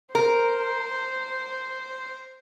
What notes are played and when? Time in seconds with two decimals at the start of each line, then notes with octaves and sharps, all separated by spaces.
0.15 A#4 C5